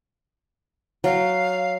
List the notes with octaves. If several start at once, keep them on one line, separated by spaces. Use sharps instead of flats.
F#3 F5